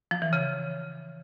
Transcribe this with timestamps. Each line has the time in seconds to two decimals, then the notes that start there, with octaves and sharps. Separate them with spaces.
0.11 F3
0.22 E3
0.33 C#3